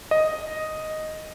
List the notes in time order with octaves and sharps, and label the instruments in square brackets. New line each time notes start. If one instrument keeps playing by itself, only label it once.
[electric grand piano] D#5